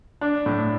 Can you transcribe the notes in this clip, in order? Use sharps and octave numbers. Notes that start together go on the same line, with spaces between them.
D4
A2